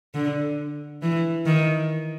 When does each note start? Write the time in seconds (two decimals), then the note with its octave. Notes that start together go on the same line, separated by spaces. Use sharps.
0.14 D3
1.02 E3
1.46 D#3